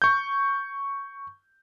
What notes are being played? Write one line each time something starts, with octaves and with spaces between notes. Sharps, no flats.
C#6 G6